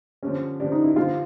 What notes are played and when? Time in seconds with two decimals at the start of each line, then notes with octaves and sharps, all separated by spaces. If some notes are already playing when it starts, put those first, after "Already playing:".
0.23 G2 D3 F3 C#4
0.60 G2 D3 F3 D4
0.72 D#4
0.84 E4
0.96 G2 D3 F3 F4